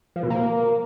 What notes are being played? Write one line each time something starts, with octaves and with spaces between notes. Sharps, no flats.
F3
B2
A#3